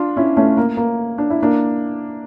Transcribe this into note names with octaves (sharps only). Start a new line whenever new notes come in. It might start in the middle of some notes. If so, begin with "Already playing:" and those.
Already playing: D4 F4
C#4 E4
A3 C#4
A#3
A#3
D4
E4
A#3 D4